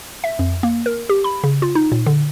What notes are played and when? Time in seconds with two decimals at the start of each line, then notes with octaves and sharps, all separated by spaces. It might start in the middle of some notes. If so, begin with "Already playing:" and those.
0.24 E5
0.39 F2
0.63 A#3
0.86 A#4
1.09 G4
1.24 B5
1.44 C#3
1.62 F4
1.75 D#4
1.92 A#2
2.06 D3